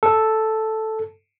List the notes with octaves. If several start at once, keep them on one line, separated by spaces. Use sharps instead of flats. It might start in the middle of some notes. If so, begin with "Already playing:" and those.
A4